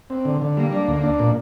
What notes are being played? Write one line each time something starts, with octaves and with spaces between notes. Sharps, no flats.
C4
D3
D3
G3 A#3
D4
D2
D4
A#2